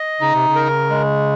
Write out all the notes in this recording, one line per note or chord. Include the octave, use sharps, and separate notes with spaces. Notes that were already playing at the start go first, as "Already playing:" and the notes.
Already playing: D#5
C#3 D#4
C3
C#3
A#4
G#3